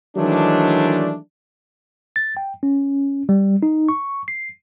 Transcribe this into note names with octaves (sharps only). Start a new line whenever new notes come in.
D#3 E3 F#3 G#3 A3 D4
A6
G5
C#4
G3
D#4
C#6
C7